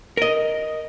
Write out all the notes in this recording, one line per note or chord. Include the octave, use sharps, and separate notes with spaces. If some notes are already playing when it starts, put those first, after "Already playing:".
A#4 D#5